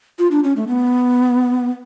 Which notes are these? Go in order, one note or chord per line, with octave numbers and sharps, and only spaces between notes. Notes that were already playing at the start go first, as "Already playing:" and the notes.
F4
D4
C#4
A3
B3